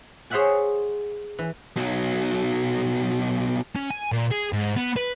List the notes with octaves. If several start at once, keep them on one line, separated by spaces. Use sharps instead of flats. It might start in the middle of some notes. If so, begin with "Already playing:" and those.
G#4 C5 C#5 E5 F#5 G#5
E3
B1 F#3
C#4
G#5
A#2
G#4
G#2
B3
B4